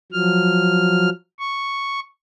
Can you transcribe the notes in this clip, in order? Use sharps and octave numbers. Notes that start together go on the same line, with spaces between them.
F3 F#3 F6
C#6